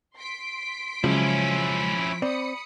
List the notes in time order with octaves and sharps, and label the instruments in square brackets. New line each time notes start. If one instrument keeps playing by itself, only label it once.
[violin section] C6 B6 D7
[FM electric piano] C#3 F#3 G#3 [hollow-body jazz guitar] F3 [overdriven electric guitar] C#4 E4
[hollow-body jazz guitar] C4 [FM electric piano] D5 [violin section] B5 D#6 C#7